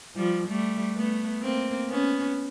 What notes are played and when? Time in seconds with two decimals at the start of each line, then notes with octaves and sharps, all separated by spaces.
0.16 F3 G3
0.48 G3 A3
0.95 A3 B3
1.42 A#3 C4
1.90 B3 C#4